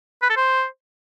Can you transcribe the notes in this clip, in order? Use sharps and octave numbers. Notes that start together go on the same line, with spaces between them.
B4
A4
C5